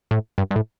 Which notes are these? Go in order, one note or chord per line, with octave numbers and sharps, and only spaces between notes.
A2
G2
G2
A2